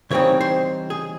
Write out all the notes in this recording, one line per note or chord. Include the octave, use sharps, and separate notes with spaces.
C#3 E3 G3 C4 D#4 C#5
C5
G#4